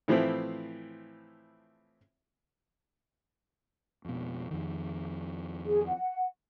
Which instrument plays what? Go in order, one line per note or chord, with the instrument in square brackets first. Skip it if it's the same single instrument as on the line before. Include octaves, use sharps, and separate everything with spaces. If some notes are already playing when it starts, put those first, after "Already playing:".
[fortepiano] A2 E3 F3 A3 C4 E4
[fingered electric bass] F2 B2
F2 D#3
[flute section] G#4
F#5